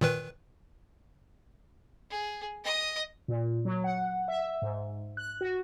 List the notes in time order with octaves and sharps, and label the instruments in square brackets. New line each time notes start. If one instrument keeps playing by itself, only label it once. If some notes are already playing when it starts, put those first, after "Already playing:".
[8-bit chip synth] A#2 D#3 B4
[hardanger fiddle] G#4
D#5 D#6
[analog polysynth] A#2
F#3
F#5
E5
G#2
F#6
F#4